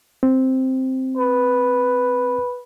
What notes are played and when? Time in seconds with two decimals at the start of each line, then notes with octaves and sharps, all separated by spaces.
0.23 C4
1.17 B4